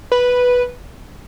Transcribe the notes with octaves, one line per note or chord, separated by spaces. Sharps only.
B4